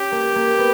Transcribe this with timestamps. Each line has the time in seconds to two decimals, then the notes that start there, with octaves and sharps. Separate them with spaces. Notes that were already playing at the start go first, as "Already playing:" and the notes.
Already playing: C#4 G4
0.12 A#3
0.36 A#3
0.58 B3